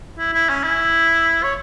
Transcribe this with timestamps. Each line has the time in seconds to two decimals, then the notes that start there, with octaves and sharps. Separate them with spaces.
0.18 E4
0.33 E4
0.49 C#4
0.64 E4
1.44 C#5